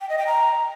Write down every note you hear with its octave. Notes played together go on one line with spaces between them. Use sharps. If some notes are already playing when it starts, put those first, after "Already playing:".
G5
D#5
G5
A#5